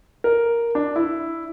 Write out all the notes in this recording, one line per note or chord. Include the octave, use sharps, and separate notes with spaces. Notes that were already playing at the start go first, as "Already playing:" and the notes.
A#4
D4
E4